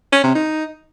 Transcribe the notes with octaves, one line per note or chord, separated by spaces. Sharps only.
C#4
C3
D#4